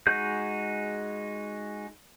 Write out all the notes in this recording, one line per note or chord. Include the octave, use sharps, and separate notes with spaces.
G#3 D#4 F#4 G#4 G6